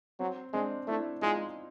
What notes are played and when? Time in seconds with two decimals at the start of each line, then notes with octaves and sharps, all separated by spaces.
0.20 F#3 C4
0.53 G#3 C4 D4
0.88 A3 D4 E4
1.22 G#3 D#4 F4